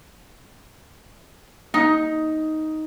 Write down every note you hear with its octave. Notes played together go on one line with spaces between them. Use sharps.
D#4